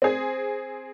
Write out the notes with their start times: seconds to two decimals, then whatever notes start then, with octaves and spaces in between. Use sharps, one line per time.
0.02 C4 G#4